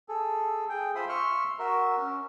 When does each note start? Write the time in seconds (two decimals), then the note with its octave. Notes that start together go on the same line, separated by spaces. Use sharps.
0.09 G#4 A4
0.69 G#4 G5
0.95 F4 C5 E5 B5 C6 D#6
1.09 E5 C6 C#6 F6
1.59 F#4 A#4 E5
1.97 C#4